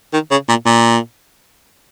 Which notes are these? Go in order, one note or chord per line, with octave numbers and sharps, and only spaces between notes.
D#3
C#3
A#2
A#2